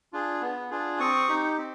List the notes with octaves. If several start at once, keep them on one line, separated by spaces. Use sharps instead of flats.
D4 F4 G#4
B3
D4 F4 G#4
C4 C#6 D#6
D#4 G4
C4